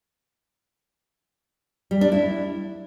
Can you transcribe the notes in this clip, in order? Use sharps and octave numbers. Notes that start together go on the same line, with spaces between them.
G3
D4
E4